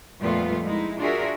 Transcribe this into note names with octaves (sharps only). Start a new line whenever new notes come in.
F2 A#2 G3 A3 B3 F4
G#3 D#4 E4
D4 F4 F#4 G#4 A#4 E5